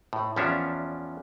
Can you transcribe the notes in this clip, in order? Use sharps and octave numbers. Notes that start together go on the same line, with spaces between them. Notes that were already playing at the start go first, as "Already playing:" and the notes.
A2
E2 F3 C#4 D4 E5 F5